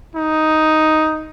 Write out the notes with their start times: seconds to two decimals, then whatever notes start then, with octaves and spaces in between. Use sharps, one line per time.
0.15 D#4